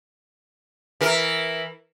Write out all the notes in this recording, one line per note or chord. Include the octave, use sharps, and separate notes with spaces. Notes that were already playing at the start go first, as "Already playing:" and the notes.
E3 A#4